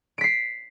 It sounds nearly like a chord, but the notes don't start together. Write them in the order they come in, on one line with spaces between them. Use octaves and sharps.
D7 B6 C7